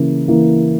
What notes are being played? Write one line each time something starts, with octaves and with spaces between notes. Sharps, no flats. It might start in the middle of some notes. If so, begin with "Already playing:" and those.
Already playing: C#3 E3 A#3
E3 A#3